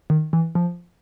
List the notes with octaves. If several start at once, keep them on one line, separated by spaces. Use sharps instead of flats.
D#3
E3
F3